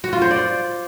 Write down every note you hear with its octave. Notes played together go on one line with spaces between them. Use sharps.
F#4
F4
C5
D5